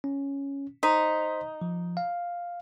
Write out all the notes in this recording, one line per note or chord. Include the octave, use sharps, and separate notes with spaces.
C#4
D#4 C5 C6 B6
F3
F5